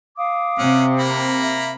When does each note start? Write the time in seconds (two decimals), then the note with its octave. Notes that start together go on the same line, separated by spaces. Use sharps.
0.17 F5 D6 D#6
0.59 C3 C#4 F#5
0.99 A#3 A#5 B5
1.41 E5